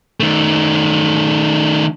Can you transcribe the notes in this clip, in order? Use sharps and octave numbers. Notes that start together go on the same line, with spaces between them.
D#3 A3